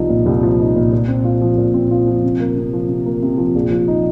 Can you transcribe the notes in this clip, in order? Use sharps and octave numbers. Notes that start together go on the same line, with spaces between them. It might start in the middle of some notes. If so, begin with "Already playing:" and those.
Already playing: C2 F3 D#4
A#2
C2
F3
D#4
A#2
A#2
C4
F4
F3
A#2
C4
F4
F3
C3
A#3
C3
F3
C3
A#3
C3
F3
A#1
F3
D#4